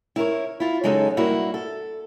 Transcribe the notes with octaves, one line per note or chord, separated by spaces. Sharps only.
E4 A#4 C5 C#5
E4 F4
C#3 F#3 G#3 D#4 A4
G2 A#3 E4 F#4
A4